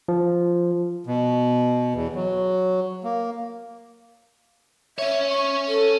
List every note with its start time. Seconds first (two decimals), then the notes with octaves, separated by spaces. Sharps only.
0.08 F3
1.04 B2
1.94 E2
2.15 F#3
3.04 A#3
4.98 C#4 C#5 E5
5.29 C#6
5.68 A4